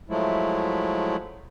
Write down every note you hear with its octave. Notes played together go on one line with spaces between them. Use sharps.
F3 F#3 G#3 A3 E4